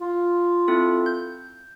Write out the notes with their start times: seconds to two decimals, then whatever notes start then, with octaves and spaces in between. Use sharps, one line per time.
0.01 F4
0.68 C4 E4 A4
1.06 G6